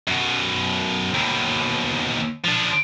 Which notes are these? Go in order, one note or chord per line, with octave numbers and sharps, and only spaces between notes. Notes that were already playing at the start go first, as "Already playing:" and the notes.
F#2 B2
D#2 B2
F3 D4